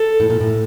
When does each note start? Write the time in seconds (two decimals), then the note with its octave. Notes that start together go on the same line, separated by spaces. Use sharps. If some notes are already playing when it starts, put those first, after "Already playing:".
Already playing: A4
0.20 A2
0.30 A#2
0.40 A2